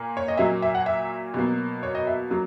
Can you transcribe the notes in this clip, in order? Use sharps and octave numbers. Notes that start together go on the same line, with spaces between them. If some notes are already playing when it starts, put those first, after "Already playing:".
Already playing: A#2 A#3
C#5
D#5
A#2 F#3 A#3 E5
E5
F#5
E5
B2 F#3 A#3
C#5
D#5
E5
F#3 A#3